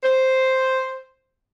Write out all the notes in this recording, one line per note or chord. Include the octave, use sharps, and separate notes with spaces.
C5